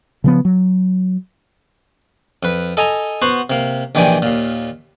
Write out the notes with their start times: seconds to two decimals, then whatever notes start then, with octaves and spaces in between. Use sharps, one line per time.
0.24 C#3 F3 B3
0.45 F#3
2.43 F2 B4
2.77 A4 D#5 G#5 A#5
3.22 B3 F#4 C5
3.50 C3 A#3
3.95 A#1 D#3 E3 G4 D5 G#5
4.22 D#2 A#2